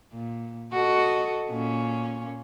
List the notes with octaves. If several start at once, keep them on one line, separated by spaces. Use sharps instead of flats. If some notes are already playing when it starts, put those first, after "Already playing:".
A#2
F#4 A4 D#5
A#2 C#4